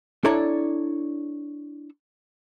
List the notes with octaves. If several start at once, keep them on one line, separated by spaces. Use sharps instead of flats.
D4 E4 A4 C#5 D5 A#5